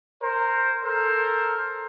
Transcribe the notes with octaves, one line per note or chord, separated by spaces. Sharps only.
A#4 C5
A4 A#4 C5